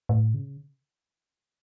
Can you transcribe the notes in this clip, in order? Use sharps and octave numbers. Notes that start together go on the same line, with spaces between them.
A2
C#3